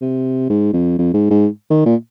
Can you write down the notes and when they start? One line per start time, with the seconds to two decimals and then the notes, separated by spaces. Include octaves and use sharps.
0.01 C3
0.49 G#2
0.74 F2
0.98 F2
1.14 G#2
1.30 G#2
1.70 D#3
1.86 A#2